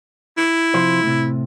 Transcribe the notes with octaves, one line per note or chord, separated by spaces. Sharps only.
E4
C3 F3 C5
A2 C3